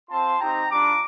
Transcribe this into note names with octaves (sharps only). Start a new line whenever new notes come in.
C4 F4 A5 C6
C4 D#4 G4 G5 A#5
G3 D4 F4 A#5 D6